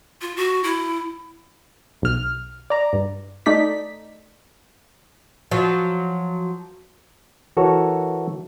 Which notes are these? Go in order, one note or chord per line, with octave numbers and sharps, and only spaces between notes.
F4
F#4
E4
B1 F6
D5 A#5
G2
A3 D#4 D5 B6
F3 F#3
E3 F#4 A4 A#4 C#5